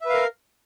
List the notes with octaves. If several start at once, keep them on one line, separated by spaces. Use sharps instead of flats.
A#4 B4 E5 F5